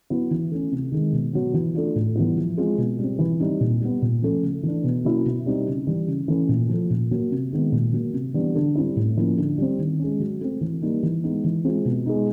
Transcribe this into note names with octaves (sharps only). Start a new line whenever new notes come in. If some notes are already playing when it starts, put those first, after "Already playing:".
F#3 B3 E4
E3
A3 C#4
C3
D#3 G#3
B2
F#3 B3
E3
A3 D4 F4
A2
E3 G3 B3 E4
F3
G#3 C4 F4
B2
G3 C4
E3
G3 C4 D#4
A#2
G3 B3
A#2
F3 A3 C#4
C#3
E3 A3 D4
B2
F#3 A#3 C#4 E4
B2
G3 C4 D#4
C#3
E3 G3
C#3
E3 A3 C#4
A#2
F3 A3
A#2
F#3 A#3
C3
D#3 G#3 B3
A#2
F#3 A#3
C3
E3 G3 B3 D4
D3
G3 C4 E4
A2
F3 A#3 C#4 E4
D3
G3 C4
D#3
G#3 C#4
F#3
A3 C4
E3
G3 A#3 D#4
E3
G#3 B3 D#4
E3
G#3 C4 F4
B2
G#3 B3 D#4